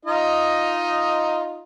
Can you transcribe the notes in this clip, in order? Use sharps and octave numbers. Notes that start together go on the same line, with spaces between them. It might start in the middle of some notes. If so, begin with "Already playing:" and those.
D#4 F4 D#5